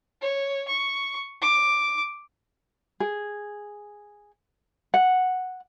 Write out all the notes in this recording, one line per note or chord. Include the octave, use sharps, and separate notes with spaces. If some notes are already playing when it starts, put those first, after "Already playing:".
C#5
C#6
D6
G#4
F#5